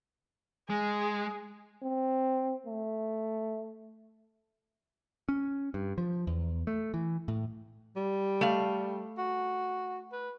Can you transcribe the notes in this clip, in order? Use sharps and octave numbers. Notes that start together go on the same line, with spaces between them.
G#3 G#4
C4
A3
C#4
G2
F3
E2
A3
E3
A2
G3
A3 F5
F#4
B4